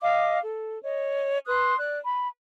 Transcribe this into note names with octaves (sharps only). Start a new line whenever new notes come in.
D#5 F5 D6
A4
C#5 D#5
B4 C6 D#6 F#6
D5 F#6
B5